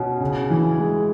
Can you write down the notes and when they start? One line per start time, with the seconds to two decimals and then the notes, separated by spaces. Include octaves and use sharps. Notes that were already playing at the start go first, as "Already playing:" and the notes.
Already playing: B2 C#4
0.20 C#3
0.50 E3
0.78 G#3